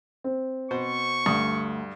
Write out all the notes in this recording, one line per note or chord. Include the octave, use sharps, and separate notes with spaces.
C4
B2 C5 C#6
D2 G2 D#6